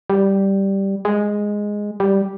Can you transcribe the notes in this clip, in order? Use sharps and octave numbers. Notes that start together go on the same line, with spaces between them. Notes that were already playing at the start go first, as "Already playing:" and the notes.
G3
G#3
G3